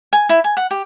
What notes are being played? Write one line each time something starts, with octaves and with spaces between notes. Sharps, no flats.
G#5
E4
G#5
F#5
G4